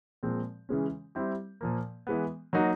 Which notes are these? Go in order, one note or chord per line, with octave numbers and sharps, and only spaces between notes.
A#2 F3 G#3 C4
C#3 E3 G#3 C#4
G3 C4 E4 G4
A#2 F3 A#3
E3 G#3 B3
F#3 A#3 D#4 F#4